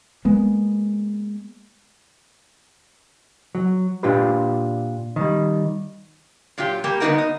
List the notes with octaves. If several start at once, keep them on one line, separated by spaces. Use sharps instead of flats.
G#3 A#3 B3
F#3
A#2 D4 F4 G4 B4
D#3 G3
A#2 F#3 F4 G4
G3 A#3 G4
D3 A#3 B3 D#4 F#4 A#4
D#5